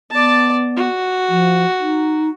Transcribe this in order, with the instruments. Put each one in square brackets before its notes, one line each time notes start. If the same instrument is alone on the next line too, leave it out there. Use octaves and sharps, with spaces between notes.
[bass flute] B3 [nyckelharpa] D5 A5
[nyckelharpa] F#4
[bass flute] F3
D#4